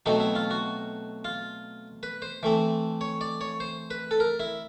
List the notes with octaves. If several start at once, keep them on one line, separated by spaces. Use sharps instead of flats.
B2 F#3 A3 C4 D#4
E4
F4
F#4
F4
B4
C5
E3 A3 C4
C#5
D5
C#5
C5
B4
A4
A#4
E4